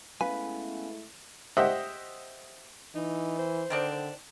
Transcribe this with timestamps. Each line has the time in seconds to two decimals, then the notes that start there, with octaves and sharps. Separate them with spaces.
0.21 G#3 A3 B3 C#4 E4 B4 F5 G#5
1.57 G4 C5 D#5 E5 F#5
2.95 E3 D#4
3.39 C5
3.70 D3 D#3 C4 D4